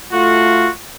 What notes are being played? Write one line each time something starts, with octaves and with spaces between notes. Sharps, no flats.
A3 F4 F#4